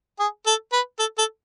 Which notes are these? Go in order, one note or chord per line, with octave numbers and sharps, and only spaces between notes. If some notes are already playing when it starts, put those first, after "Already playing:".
G#4
A4
B4
A4
A4